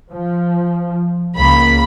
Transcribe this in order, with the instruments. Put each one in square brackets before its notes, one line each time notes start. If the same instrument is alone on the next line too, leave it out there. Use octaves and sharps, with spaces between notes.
[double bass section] F3
[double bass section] C#2 A#3 [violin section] B5